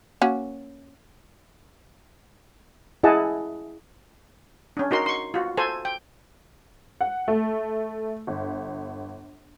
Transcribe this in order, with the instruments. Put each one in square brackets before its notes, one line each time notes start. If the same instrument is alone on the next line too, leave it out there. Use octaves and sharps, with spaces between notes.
[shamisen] A#3 C#4 F#4
[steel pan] E4 G#4 D#5 F#5 A5
C#4 D4
D#4 F#4 A#4 C6
C6 C#6
F4 F#4
A4 C5 G#5
G5
[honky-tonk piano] F#5
A3
G1